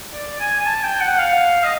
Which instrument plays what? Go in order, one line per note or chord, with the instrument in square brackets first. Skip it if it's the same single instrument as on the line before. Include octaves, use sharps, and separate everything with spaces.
[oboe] D5
G#5
G#5
A5
G5
F#5
F5
D#5